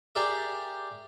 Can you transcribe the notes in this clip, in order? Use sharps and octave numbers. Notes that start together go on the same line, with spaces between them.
G4 G#4 A#4 D5 E5